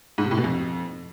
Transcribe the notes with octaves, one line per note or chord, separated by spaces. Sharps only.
G#2
C3
A2
B2
F2